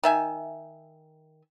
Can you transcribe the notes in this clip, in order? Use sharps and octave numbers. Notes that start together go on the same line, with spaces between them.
D#3 E5 G#5